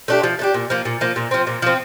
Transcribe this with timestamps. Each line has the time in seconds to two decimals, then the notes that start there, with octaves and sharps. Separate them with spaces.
0.08 A3 D4 G4
0.23 F3
0.39 A3 D4 G4
0.54 A#2
0.70 F3 A#3
0.85 A#2
1.01 F3 A#3
1.16 A#2
1.31 F3 C4
1.47 A#2
1.62 F3 C4